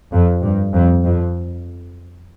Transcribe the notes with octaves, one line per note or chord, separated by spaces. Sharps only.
F2
G2
F2
F2